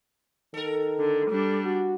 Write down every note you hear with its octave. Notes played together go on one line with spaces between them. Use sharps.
D#3 A4 A#4
D3
G3 D4
F#4